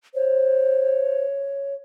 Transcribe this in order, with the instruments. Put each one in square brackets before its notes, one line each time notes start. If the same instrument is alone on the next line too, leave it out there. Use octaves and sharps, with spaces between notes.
[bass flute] C5 [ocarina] C#5